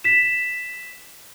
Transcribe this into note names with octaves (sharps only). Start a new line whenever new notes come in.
B6 E7